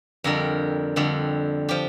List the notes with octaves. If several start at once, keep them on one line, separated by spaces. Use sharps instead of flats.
F2 D3 G3 A#4
F2 D3 G3
F3 G4